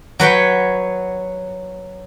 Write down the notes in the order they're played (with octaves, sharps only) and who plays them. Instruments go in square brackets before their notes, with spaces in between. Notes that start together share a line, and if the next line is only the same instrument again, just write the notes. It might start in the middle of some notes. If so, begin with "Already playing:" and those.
[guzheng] F#3 B4 C#5 G5